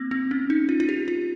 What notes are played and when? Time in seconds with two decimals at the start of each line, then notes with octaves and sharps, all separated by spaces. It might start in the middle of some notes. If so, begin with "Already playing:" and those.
Already playing: A#3 C4
0.11 C4
0.31 C#4
0.50 D#4
0.69 F4
0.80 F4
0.89 G4
1.08 F4